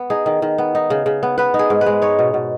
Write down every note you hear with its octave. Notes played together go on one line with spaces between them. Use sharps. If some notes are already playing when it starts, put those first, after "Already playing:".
Already playing: B3
D#4 G#4
D#3
D#3
B3
D#4
C#3
C#3
B3
B3 B4
D#4
G#4
G#2
B4
G#3
D#4 C#5
B2
B2